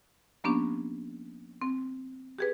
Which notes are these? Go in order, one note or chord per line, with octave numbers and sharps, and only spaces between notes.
F3 A#3 B3 C#4 D4 G4
C4
G4 G#4 B4